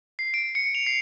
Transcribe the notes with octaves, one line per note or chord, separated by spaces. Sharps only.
C7
D7
C#7
F7
C7